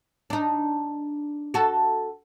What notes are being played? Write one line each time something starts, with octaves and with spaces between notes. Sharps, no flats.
D4 D#4
F#4 A4